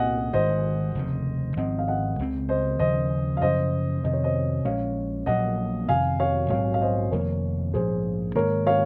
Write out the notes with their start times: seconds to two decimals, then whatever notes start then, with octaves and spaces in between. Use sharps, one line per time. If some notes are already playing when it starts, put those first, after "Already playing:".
Already playing: C2 A#2 C4 D#5 F#5 G#5
0.33 G#1 G#2 D#3 C5 D#5
0.95 F1 D#2 C#3
1.56 G#1 G#2 F3 C4 D#5 F#5
1.79 F5
1.87 D#5 F#5
2.19 C#2 C#3 G#3 C4
2.49 C5 D#5
2.79 D#2 C#3 F3 C5 D#5
3.37 F5
3.41 F#2 C#3 F3 C5 D#5
4.04 F2 C3 D#3 D#5
4.13 C#5
4.23 C5 D#5
4.65 A#1 A#2 G#3 C#4 C#5 F5
5.26 A#1 A#2 F#3 A#3 D#5 F#5
5.89 F1 F2 C3 D#3 F5 G#5
6.20 C#5 F5
6.50 A#1 G#2 F#3 C4 C#5 F5
6.74 F5
6.81 C5 D#5
7.11 F1 F2 D#3 A#3 A#4 C#5
7.73 A#1 G#2 F3 G#4 C5
8.35 G#2 D#3 A#3 A#4 C#5
8.67 C#5 F5